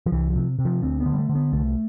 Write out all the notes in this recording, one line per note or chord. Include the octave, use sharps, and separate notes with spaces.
F3
C2 E3
F3
C3
C3
F3
D2 C4
B3
D3
G3
A3
D3
B3
C2 A3